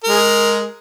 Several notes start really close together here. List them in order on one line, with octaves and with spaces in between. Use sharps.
A#4 G#3 G#4